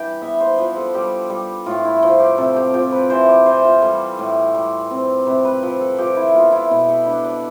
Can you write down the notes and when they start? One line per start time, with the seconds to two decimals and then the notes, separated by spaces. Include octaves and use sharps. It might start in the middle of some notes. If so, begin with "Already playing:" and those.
Already playing: E3 G3 D4 G5 B5
0.22 B3 E5
0.40 C5
0.58 F3 B4
0.77 A4
0.94 G3 G4
1.30 G3
1.66 A2 F4
1.85 E4
2.03 F3 F4
2.20 G4
2.38 C3 A4
2.56 G4
2.74 F3 G4
2.92 B4
3.10 E3 C5
3.29 D5
3.46 E3 C5
3.64 F4
3.82 G3 A4
4.19 A2
4.54 G3
4.91 C4
5.26 C3 B4
5.45 B4
5.63 F3 B4
5.81 A4
5.98 F3 G4
6.17 E4
6.34 B3 F4
6.52 E4
6.70 B2 E4
6.89 A4
7.06 D4 B4
7.25 D5